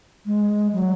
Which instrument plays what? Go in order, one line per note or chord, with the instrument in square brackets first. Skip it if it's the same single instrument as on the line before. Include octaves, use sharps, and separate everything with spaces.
[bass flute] G#3
F#3